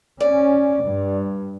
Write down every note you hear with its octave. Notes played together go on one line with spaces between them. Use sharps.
C#4 D5
G2